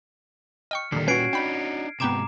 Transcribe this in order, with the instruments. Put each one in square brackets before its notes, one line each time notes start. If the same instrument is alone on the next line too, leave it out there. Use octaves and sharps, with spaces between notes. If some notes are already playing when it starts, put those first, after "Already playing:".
[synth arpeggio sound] D#5 G5 C#6 [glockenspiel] F6 C#7
[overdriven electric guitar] A#2 G3 [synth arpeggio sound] D3 D#3 [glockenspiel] C7
[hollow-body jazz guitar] C#4 F#4 [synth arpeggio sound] B4 [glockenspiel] G#6 C7 D7
[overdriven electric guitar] D4 D#4 [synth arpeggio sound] G5 B5
[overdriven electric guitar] G#2 C3 [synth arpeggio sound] B3 G5 D7 [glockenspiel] A#5 D6 E7